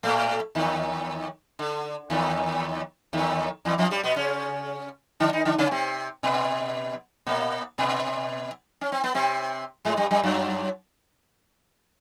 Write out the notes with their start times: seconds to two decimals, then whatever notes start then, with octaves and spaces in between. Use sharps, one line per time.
0.03 A2 A3
0.55 D#2 D#3
1.59 D3
2.10 D#2 D#3
3.13 D#2 D#3
3.65 E2 E3
3.78 F2 F3
3.90 G2 G3
4.04 B2 B3
4.16 C#3 C#4
5.20 D3 D4
5.33 D#3 D#4
5.45 D3 D4
5.58 C#3 C#4
5.71 C3 C4
6.23 B2 B3
7.27 A#2 A#3
7.78 B2 B3
8.81 C#4
8.92 C4
9.04 B3
9.14 C3 C4
9.85 G#2 G#3
9.97 G2 G3
10.11 G2 G3
10.23 F#2 F#3